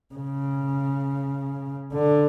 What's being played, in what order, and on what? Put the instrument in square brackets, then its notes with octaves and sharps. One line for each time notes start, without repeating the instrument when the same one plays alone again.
[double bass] C#3
D3